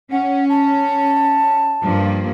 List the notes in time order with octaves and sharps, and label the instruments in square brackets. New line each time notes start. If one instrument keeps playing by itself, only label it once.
[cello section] C#4 [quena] F#5
[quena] A5
[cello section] G2 F3 A#3